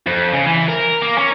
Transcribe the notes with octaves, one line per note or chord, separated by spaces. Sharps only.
F2
C#3
E3
A#4
A#3
C#4